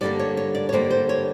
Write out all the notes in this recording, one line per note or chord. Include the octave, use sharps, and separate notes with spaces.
G2 D3 G3 A#3 D5
C#5
C#5
D5
C#5
G2 D3 G3 A#3 C5
C5
C#5